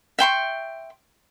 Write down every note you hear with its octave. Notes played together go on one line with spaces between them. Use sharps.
E5 G5 C6 C#6